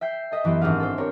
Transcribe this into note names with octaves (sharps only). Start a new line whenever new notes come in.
E5 G5 G6 C7
A4 D#5 E5
F#2 E3 B3 G4 C6
G#1 C4 D4 G4 G#4 F5
A4 C5
C4 D4 G4 A#4 C#5